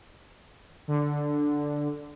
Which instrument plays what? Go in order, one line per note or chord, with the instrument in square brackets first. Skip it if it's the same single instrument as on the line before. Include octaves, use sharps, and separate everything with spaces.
[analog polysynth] D3